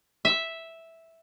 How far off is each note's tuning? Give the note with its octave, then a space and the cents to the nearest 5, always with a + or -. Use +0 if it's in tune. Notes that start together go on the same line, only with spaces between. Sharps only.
E5 -5